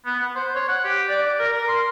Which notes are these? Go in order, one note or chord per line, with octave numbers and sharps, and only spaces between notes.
B3
F#5
C5
C#5
F#5
G4
D5
D6
A#4
A#4
C6